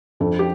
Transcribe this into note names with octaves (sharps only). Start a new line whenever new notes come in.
F2 F3 D4 A4
G4